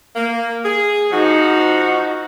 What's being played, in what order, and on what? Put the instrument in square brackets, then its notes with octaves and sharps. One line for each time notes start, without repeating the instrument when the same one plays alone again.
[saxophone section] A#3
G#4
[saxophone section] F3 F#4 [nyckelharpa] D#4